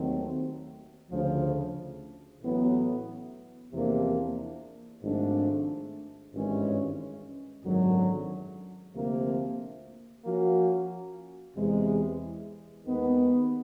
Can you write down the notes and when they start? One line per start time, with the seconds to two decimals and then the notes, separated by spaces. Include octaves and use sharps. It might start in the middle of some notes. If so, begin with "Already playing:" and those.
Already playing: D#2 D#3 F#3 A3 C4
1.11 D2 C#3 F3
2.43 A1 A2 F#3 B3
3.73 E2 C3 F3 A#3 D4
5.03 G#1 G#2 F3 A3 D4
6.34 G#1 G2 E3 G#3 C#4
7.64 G#1 F#2 D3 F#3
8.95 D2 C3 F3 A#3
10.25 F3 A#3 C#4 F#4
11.57 E2 C3 E3 G#3
12.86 D#2 D#3 G#3 B3